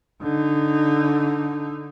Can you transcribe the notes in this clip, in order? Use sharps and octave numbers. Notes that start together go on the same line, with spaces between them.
D3 D#4